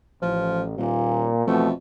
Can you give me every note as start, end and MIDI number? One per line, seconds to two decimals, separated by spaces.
0.22 0.74 33
0.22 0.63 53
0.78 1.32 27
0.78 1.46 46
1.47 1.73 41
1.47 1.69 47
1.47 1.69 52
1.47 1.69 57